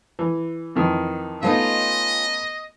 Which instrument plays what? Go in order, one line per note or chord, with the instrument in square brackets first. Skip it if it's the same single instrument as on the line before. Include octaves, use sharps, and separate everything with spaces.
[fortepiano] E3
F2 D#3 E3
[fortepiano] A3 B3 D#4 [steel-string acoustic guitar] C#4 F4 [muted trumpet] D#5